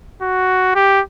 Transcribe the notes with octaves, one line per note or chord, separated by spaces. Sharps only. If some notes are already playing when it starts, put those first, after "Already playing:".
F#4
G4